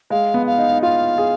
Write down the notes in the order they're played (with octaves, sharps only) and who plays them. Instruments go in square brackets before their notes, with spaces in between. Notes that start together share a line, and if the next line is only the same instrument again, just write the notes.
[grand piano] G#3 [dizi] F5
[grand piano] B3
[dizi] F5
[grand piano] D#4
D#4
[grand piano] F4 [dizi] F5
[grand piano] G#4